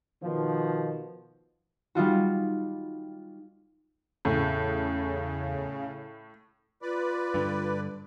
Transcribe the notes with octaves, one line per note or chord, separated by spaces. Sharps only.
B2 D#3 F3
G3 D#4 F4 F#4
E2 A2 C#3
F4 B4 D5
G2 D3